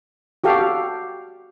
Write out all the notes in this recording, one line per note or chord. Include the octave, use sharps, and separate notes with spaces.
F#4 G4 A4 F5